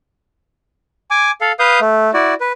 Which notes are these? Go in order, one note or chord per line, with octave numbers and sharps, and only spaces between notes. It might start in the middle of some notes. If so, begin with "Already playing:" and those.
G#5 D6
A4 F5
B4 F5 D#6 G6
A3
E4 F#4 D5
B4